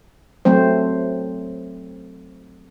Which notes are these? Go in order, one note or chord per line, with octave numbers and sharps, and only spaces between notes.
F#3 A3 C4 C5